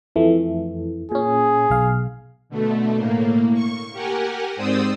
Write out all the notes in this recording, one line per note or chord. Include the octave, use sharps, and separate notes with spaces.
F2 E3 A3
A#2 C#4 G#4
B1 F5
B2 D3 A3
A2 A#3
C#6
G4 A#4 F#5 G#5
G#2 C4 C5 D5 D#6 E6